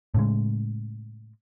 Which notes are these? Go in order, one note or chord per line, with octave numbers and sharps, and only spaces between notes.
A2 C#3 G#3